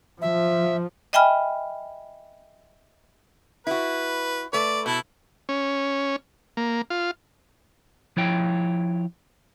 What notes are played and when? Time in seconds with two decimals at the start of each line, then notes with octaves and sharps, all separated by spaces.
0.21 F3 E5
1.13 D#5 E5 G5 G#5 B5 F6
3.67 E4 F#4 B4
4.53 A3 B4 D5
4.86 B2 E4 A4
5.49 C#4
6.57 A#3
6.90 F4
8.17 F3 E4 C#5 G5